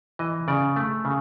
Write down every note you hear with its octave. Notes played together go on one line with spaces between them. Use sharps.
E3 D#5
C#3 D5
A3
C#3